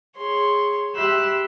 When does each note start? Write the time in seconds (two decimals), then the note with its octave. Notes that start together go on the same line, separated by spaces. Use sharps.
0.16 G#4 C#5 C6
0.95 G4 E5 B5 C6 E6 F#6